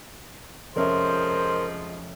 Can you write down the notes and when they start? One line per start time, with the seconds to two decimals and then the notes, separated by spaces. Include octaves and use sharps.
0.76 F1 F3 G#3 C#4 A#4 C5 E5